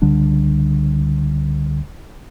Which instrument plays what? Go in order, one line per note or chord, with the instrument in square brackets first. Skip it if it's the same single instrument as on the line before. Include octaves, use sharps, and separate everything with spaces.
[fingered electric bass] C#2 D3 G3 D4